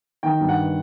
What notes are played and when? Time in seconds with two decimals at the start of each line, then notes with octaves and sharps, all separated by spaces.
0.23 D#3 G5
0.41 G2
0.49 F#5